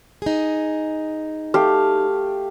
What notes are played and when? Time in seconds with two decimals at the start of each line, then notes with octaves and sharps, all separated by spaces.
0.22 D#4 G#4
1.54 A3 G4 F5